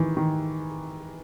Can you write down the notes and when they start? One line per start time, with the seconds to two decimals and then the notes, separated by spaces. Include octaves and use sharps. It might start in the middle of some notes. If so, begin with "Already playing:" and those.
Already playing: D#3 E3
0.17 D#3